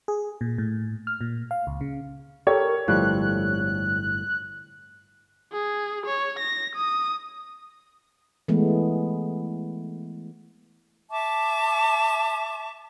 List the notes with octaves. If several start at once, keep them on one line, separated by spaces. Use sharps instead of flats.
G#4
A#2
A2
F6
A#2
F5
C#2
C#3
G4 A4 A#4 C#5
G1 A2 F3 G3 F#6
G#4
C#5
A#6
D#6
E3 G#3 A3 B3
E5 A5 C#6 D6